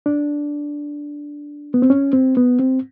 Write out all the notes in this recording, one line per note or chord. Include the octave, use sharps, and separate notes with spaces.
D4
B3
C4
C#4
C4
B3
C4